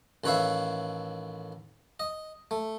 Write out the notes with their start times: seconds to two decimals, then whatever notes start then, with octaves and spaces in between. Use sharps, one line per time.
0.24 A1 D#3 B4 C#5 E5 F5
2.00 D#5
2.51 A3